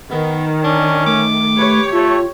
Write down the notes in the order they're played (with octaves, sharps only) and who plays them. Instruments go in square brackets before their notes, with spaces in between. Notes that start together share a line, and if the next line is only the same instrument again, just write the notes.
[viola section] D#3 [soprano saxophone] B3
[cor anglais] C#4 [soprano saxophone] D4
[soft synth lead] A3 [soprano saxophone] D6
[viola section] G4 C#5 [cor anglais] B4
[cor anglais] A3 [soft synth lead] F4